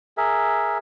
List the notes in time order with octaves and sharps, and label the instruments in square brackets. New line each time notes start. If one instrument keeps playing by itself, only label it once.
[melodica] G#4 A#4 E5